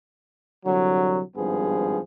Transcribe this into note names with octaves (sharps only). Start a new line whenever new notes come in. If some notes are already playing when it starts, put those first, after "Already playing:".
C2 D3 F#3
G#1 G2 F3 B3 G#4